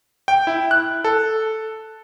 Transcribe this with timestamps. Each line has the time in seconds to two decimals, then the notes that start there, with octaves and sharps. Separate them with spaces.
0.28 G5
0.47 E4
0.71 F#6
1.04 A4